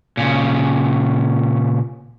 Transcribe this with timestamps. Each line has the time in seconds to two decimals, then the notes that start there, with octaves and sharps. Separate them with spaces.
0.17 A#2 C#3